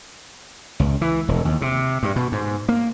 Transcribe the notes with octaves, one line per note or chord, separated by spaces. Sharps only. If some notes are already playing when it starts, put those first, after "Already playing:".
C#2
E3
E1
D#2
C3
G2
B2
G#2
A#3